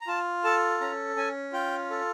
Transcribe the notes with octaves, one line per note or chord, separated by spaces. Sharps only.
A#5
F4 A5
A4 A5
C#4 A#5
C#4 G#5
F4 G5
A4